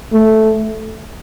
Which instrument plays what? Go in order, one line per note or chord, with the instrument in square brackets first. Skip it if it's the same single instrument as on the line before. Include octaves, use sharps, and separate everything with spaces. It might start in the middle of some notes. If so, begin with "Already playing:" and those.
[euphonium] A3